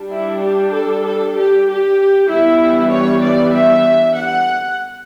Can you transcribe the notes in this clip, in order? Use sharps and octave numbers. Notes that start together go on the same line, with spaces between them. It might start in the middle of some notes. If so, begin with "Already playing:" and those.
Already playing: G3 D4
E4
G4
A4
A4
G4
G4
E3 G3 B3 D4 E4
C#5
D5
E5
F#5